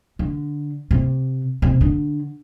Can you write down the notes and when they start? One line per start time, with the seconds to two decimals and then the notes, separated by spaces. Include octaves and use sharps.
0.19 D3
0.91 C3
1.62 C3
1.81 D3